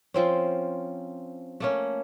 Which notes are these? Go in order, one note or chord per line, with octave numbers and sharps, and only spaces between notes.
F3 C4 C#4
A3 A#3 C#4